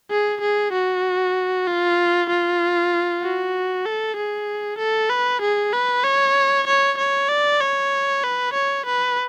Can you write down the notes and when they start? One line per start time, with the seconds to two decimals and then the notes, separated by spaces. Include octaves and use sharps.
0.11 G#4
0.41 G#4
0.73 F#4
1.67 F4
2.29 F4
3.22 F#4
3.86 A4
4.17 G#4
4.79 A4
5.10 B4
5.42 G#4
5.73 B4
6.04 C#5
6.67 C#5
6.98 C#5
7.29 D5
7.61 C#5
8.24 B4
8.54 C#5
8.86 B4